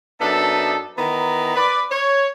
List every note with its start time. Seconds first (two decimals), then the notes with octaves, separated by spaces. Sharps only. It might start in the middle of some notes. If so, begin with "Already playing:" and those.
0.21 F#2 B3 D4 D#4 A4 E5
0.97 D#3 E3 B3 A#5
1.56 B4 D5
1.91 C#5